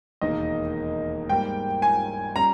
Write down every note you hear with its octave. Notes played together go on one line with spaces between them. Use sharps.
E1 D#2 D#3 A#3 D#4 D#5
G#2 G3 A#3 G5
G#5
G3 C#4 A#5